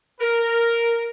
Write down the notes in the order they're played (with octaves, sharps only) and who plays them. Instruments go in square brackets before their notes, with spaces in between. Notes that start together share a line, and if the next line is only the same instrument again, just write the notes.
[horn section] A#4